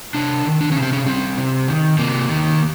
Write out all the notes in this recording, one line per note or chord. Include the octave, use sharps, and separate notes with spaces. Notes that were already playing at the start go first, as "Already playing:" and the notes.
C3 D4
D#3
D4
C3 C#4
C4
C#4
G3 C4
C3
D#3
C3 A#3
D#3